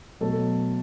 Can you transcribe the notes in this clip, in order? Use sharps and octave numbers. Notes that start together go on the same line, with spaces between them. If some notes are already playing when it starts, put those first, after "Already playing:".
B2 F#3 A3 A4